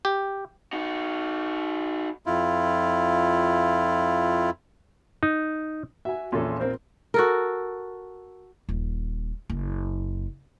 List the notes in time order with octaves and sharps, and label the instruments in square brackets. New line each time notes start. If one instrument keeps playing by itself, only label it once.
[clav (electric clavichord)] G4
[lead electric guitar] D#4 F#4
[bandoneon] F2 E4 F4
[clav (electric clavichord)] D#4
[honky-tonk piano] F#4 [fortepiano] E5 G#5
[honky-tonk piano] A#1 F4 C6 [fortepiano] E2 C#4 A4
[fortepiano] C4 A#4 C5
[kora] F#4 A4 A#4
[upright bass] D#1
F#1